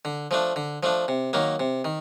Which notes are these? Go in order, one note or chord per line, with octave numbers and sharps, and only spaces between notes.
D3
F3 A3 D4
D3
F3 A3 D4
C3
D#3 F#3 A#3
C3
D#3